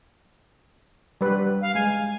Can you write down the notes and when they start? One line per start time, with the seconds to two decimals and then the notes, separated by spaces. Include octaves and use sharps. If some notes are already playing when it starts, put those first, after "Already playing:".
1.21 G3 B4
1.61 F5
1.75 G#3 G#5